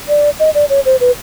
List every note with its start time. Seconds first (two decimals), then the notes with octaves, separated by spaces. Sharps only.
0.09 D5
0.40 D#5
0.55 D5
0.70 C#5
0.85 C5
1.01 B4